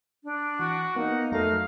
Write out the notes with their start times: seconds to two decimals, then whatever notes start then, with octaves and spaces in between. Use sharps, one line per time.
0.24 D4
0.59 E3 F#4
0.96 A#3 B3 D#4 F#5
1.32 F2 F#3 A3 A#4 F5